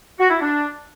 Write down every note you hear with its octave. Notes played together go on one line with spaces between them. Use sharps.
F#4
E4
D4